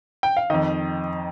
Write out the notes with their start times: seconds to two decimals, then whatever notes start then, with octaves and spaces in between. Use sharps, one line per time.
0.23 G5
0.37 F5
0.50 F2 D#3 D#5